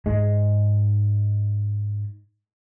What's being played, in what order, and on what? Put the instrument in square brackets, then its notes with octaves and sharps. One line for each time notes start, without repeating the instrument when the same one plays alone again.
[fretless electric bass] G#2 G#3